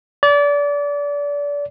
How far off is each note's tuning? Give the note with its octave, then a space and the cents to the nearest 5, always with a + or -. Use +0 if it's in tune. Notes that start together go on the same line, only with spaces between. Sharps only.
D5 -30